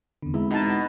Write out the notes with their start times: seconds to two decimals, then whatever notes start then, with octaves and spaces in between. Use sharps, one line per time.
0.22 E2 D3 B3 C4
0.34 G#3 E4
0.51 B2 D#4 A5